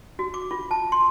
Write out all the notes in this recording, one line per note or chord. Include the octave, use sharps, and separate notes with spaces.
F#4
D6
F4
A5
C6